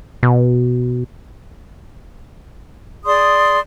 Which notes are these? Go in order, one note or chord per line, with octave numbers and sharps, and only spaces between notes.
B2
G#4 D5 C6 D#6